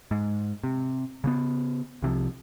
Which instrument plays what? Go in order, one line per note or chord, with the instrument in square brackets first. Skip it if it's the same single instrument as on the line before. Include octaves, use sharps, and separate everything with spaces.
[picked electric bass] G#2
C3
C#3 A#3 B3
C2 C3 E3 F3